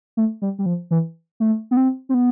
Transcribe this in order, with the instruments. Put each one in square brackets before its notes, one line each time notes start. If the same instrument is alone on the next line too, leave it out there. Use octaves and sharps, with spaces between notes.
[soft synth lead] A3
G3
G3
F3
E3
A3
B3
C4
C4
B3